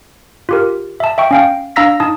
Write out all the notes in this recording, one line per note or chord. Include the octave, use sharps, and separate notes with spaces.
F4 G4 A#4
E5 A5
E5 G5 C#6
C#4 F5 G5
D4 F5 A#5 E6 A#6 B6
D#4 A5 D#6